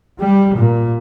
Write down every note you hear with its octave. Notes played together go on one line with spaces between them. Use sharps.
G3
A#2